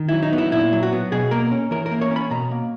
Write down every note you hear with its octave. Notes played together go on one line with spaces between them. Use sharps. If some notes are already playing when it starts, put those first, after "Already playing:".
Already playing: D#3
F#3 E4
D#4
B3
E4
A#2 E4
F#3
F#4
B3
B2 G#4
A#3 A#4
C#4
E3 A#4
A#4
A#3
C#5
C#4
B5
B2 A#5
A#3